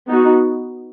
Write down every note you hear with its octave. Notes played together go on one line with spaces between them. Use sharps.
B3 D#4 F#4